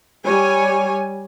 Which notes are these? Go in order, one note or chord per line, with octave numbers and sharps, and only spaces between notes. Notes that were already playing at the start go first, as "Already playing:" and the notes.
G3 C#5 G#5